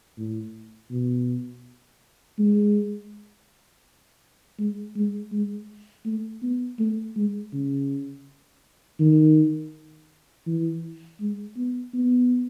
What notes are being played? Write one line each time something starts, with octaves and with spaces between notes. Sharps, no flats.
A2
B2
G#3
G#3
G#3
G#3
A3
B3
A3
G#3
C#3
D#3
E3
G#3
B3
B3